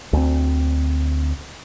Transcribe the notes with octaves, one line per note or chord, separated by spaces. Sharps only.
D2 C4